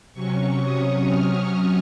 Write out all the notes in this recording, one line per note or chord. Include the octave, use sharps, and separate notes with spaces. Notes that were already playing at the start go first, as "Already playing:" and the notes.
C3 F#3 C#4 C#6
D#6
F6